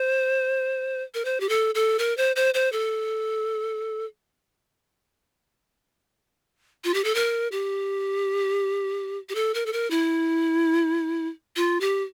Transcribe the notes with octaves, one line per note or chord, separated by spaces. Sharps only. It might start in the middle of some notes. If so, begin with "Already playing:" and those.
Already playing: C5
A#4
C5
G4
A4
A4
A#4
C5
C5
C5
A4
F4
G4
A4
A#4
G4
G4
A4
A#4
A4
A#4
E4
F4
G4